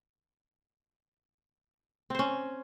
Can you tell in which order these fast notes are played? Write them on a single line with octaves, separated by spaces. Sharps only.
C4 C5 C#4